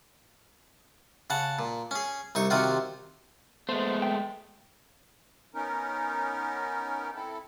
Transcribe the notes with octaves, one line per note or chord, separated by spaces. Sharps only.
C#3 F#5 A5
A#2
C#4 G#4
C2 D#4 C#6
C3 D#3 C4 F4 F#4
G#3 A3 B3 C5
G5
B3 C#4 D#4 A#4
C4 E4 A4